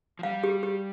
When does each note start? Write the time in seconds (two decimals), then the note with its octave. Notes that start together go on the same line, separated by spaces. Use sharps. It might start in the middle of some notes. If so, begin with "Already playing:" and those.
0.19 F3
0.23 G3 F5
0.44 G4
0.63 G4